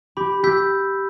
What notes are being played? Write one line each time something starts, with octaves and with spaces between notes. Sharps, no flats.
G4 B5
G4 E6 G6 B6